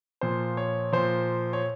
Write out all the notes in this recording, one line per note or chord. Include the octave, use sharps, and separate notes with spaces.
A#2 F3 C5
C#5
A#2 F3 C5
C#5